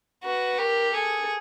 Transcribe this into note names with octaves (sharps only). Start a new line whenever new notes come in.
F#4 B4
G4 A#4
G#4 A4